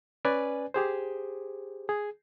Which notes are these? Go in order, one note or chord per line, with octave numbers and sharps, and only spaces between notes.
C#4 B4 D5 G#5
G4 G#4 C5
G#4